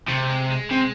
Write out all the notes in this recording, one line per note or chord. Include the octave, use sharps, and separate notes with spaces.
C3 A3
G#3
G#3
C3